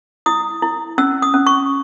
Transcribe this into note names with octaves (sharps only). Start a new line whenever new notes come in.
E4 D#6
E4
C#4 E6
D#6
C#4
C#6